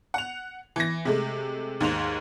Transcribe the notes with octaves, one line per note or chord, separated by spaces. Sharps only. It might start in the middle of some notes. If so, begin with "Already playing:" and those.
F#5 F7
E3 A#6
C3 G#3 A3
D#2 G#2 C5 F7